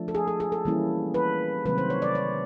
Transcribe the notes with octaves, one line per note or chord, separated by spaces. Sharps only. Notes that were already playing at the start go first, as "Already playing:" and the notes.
Already playing: F3 A3 D4
A4
G#4
A4
G#4
A4
E3 G3 A#3 C#4 E4
B4
C3 D#3 F#3 A3 C4 B4
C5
C#5
D5
C#5